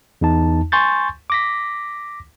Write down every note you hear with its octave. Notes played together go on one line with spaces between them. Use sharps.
E2 D#4 A5
G#5 C6 C#6 G6 A6
D6 A#6 B6